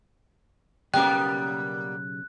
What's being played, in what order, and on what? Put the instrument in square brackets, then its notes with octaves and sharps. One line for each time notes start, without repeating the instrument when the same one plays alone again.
[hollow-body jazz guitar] B1 C#3 G4 [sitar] G3 A#3 B3 [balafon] G5 [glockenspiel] F#6